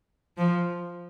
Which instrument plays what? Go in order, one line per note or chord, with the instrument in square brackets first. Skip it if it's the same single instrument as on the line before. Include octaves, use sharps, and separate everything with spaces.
[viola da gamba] F3